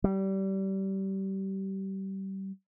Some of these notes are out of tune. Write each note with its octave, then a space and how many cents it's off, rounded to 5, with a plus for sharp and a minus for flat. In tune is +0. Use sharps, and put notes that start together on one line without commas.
G3 -25